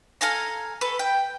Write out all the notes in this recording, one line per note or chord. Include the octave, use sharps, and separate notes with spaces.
A4 F5 G#5 A#5
A4 B4 C#6
G5